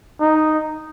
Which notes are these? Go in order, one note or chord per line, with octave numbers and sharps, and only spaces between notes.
D#4